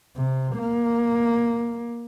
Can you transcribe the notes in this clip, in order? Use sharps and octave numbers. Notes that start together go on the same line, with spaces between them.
C3
A#3